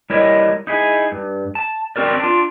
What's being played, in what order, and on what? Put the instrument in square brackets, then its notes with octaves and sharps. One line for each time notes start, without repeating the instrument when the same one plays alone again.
[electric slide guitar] G3 E4 A#4 C#5 D#5
D#4 E4 G#4
G2
A5
C4 F#4 A#4 D5
D4 F4